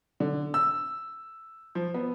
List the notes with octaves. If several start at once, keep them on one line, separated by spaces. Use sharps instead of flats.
D3
E6
F3
B3